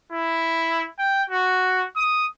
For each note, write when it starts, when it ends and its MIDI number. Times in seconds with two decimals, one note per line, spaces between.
0.13 0.85 64
0.99 1.23 79
1.30 1.85 66
1.97 2.25 87